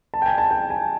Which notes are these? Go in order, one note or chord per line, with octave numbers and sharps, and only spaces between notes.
A5
G5
G#5
A5
G5
G#5